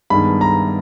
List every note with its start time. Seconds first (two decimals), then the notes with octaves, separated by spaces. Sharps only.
0.10 G2 D#3 G#3 B3 B5
0.41 A#5